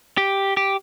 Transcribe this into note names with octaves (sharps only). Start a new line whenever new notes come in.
G4
G4